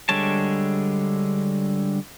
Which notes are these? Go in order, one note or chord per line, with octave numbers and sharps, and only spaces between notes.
D3 G3 G#3 C#5 A5